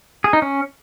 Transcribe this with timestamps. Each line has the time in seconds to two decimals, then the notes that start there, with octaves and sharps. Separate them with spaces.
0.24 G#4
0.33 D#4
0.42 C#4